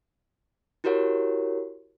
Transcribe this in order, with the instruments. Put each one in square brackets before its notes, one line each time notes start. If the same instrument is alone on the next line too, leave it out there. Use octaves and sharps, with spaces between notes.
[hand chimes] E4 F#4 G4 A#4 C#5 F#5